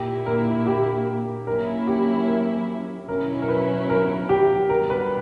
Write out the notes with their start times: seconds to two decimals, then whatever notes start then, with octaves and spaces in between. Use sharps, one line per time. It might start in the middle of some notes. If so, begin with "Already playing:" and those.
Already playing: A#2 A#3 E4 G4
0.26 A#4
0.67 G4
1.47 F#3 A#3 C#4 E4 A#4
1.87 G4
2.27 A#4
3.08 B2 F#3 C#4 E4 A#4
3.42 A#4
3.49 B4
3.90 A#4
4.29 G4
4.69 B2 G3 B3 A#4
4.90 B4